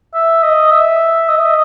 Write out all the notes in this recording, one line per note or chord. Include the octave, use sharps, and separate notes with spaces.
E5
D#5
E5
D#5
E5
D#5